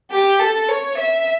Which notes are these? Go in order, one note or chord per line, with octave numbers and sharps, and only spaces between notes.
G4
A4
C#5
E5